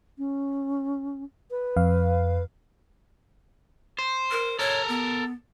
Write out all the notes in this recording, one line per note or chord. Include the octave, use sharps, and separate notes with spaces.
C#4
B4
F2 F5
C5
A#4
A4 A#4 C#5
B3